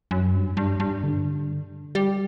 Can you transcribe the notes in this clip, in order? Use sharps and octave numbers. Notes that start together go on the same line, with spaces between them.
F#2
G2
G2
G2
D3
G3